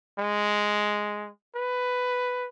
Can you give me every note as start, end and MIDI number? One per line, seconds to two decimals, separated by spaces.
0.19 1.29 56
1.55 2.48 71